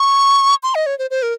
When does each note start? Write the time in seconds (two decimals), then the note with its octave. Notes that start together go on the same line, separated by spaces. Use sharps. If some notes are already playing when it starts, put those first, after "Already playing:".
Already playing: C#6
0.63 C6
0.75 D#5
0.86 C#5
0.99 C5
1.11 C5
1.22 A#4